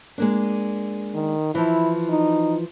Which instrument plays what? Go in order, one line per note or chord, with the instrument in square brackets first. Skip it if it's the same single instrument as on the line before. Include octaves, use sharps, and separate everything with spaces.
[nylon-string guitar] G#3 A#3 D4
[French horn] D#3
[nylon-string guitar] E3 F3 [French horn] E4
[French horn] D#4